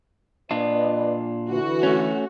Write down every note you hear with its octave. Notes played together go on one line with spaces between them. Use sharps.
A#2 D4 F4 B4 D5 D#5
D3 E3 F#4
A3 C#4